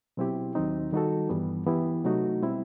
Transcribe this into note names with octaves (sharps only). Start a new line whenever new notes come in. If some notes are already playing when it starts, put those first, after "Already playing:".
B2 F#3 C4 E4 G4
D#2 D#3 F#3 C4 D#4
D#3 G3 D#4 F#4 A4
G2 E3 G3 B3
E3 B3 E4 G4
C3 F#3 A3 D#4 F#4
B2 G3 C4 E4